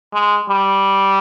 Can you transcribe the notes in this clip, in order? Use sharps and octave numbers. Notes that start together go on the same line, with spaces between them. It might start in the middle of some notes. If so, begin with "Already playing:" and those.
G#3
G3